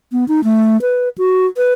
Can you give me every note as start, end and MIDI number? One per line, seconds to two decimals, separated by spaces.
0.12 0.27 59
0.28 0.41 63
0.44 0.80 57
0.82 1.09 71
1.18 1.46 66
1.57 1.73 71